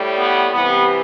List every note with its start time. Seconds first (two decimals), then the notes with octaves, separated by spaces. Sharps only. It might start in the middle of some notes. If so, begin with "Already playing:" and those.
Already playing: A2 G3
0.18 B3
0.52 C3 E3 G3 B3